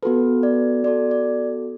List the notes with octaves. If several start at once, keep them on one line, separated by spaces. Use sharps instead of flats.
B3 F#4 A4 B4
D5
B3 F#4 A4 D5
D5